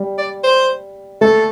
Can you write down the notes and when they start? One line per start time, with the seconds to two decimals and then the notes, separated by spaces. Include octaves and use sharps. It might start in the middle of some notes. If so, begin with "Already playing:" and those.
Already playing: G3
0.18 D5
0.44 C5
1.21 A3 A4